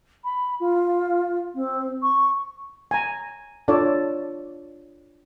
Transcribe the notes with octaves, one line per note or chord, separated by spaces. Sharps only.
B5
F4
C4
C#6
G#5 A#5
D4 F4 A4 C#5 D5 A5